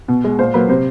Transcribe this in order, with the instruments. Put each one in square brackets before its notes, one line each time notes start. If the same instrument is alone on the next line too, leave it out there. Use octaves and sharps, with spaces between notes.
[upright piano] B2
G#3
A#2 C5
F#3 A#3 B4
C3 C5